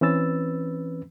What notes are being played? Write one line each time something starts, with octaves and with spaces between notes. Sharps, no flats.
E3 C4 C#4 B4 E6 A6